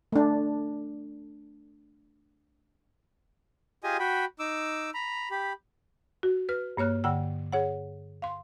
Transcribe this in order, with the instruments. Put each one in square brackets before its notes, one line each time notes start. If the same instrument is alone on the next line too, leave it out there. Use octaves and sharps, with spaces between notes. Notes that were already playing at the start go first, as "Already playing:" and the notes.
[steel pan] A3 D4
[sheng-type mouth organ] F4 G4 G#4 D#5 G#5 D#6
F#4 G5 B5
D#4 D6 E6
A#5 B5
G4 B5
[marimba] F#4
B4 F6
G2 A#3 C#5 F6 F#6
G2 D3 F#5 G5 E6
G#4 C#5 F#5
F5 C6